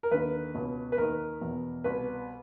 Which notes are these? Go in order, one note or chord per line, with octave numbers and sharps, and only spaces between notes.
A#4
D#2 D3 B4
C#2 B2
B4
D#2 D#3 A#4
E2 B2
C2 B2 B4